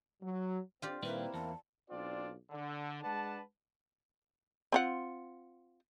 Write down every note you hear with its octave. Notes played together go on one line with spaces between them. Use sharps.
F#3
C4 F4 G4 D5
A#2 D#3 G3 A#3 C4 E4 B4
E2 A5
B1 C4 D4 F4 D5
D3
G#3 D4 B4 F#5 A5
C4 F4 F#5